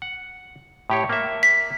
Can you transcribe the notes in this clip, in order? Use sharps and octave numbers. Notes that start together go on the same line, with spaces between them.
F#5
A2 G4 C#5
A#3 E5
B6